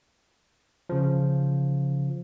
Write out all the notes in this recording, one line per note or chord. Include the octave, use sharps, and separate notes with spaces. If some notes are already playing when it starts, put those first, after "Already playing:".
C#3 F3